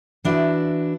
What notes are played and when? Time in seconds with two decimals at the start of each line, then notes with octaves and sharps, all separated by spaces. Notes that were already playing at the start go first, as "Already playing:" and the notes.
0.24 E3 D4 E4 F#4